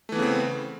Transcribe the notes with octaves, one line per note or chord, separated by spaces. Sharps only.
C#3 E3 A3 B3 C4